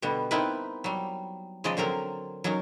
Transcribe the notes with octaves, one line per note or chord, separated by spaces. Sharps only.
B2 D3 G3 B3
B3 C4 D#4 E4 A#4 B4
F#3 G3
C#3 F3 F#3 G#3 D5 D#5
D3 F#3 C4 A#4
F#3 C#4 D#4 A#4